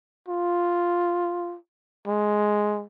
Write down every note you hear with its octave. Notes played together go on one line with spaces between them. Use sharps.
F4
G#3